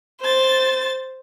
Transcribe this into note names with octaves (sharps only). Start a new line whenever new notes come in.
C5 A6